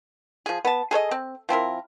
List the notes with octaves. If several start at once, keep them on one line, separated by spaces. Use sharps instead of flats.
F3 G#4
B3 A5
G#4 A4 C#5 D#5
C4
F3 C4 E4 A#4